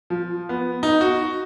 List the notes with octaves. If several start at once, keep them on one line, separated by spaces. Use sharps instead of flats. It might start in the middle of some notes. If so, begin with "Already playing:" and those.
F3
B3
D#4
F#4